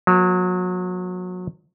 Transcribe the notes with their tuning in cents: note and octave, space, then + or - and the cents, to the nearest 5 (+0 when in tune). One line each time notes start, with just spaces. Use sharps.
F#3 -30 A#3 +35